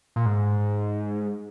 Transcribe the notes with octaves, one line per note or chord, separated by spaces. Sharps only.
A#2
G#2